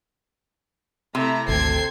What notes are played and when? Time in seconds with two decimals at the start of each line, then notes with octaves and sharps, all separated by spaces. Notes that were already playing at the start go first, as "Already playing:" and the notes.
1.15 C3 A3 E4 A#5
1.49 G#1 D2 A4 C5 G5 G#6 C7